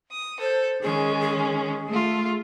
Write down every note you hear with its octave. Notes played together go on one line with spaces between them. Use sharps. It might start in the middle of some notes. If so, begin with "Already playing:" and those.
D#6
A4 C5
D#3 G#3 C#4 G#4
G#4
A3 F4